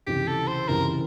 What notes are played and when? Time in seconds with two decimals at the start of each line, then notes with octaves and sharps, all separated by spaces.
0.07 C#2 C3 E3 G4
0.28 A4
0.48 C5
0.68 C#2 C3 E3 A#4